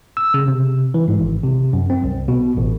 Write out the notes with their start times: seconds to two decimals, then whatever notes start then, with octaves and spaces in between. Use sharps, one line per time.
0.17 E6
0.34 C#3
0.48 C3
0.94 E3
1.08 G#2
1.20 G#1
1.44 C3
1.73 F#2
1.90 C4
2.04 C2
2.28 B2
2.57 A1